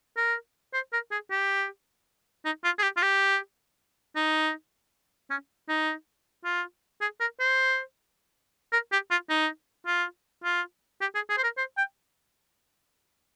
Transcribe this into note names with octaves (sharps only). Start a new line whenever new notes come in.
A#4
C5
A#4
G#4
G4
D#4
F4
G#4
G4
F4
G4
D#4
C#4
D#4
F4
G#4
A#4
C5
A#4
G4
F4
D#4
F4
F4
G4
G#4
G#4
C5
A#4
C5
G5